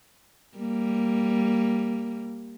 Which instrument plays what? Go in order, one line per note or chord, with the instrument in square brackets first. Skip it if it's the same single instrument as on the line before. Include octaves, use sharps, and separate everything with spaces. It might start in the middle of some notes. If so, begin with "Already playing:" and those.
[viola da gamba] G3 A#3